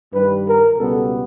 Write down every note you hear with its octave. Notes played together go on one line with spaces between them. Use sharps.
G2 D#3 G3 B4
A#4
C#2 B2 G3 B3 A4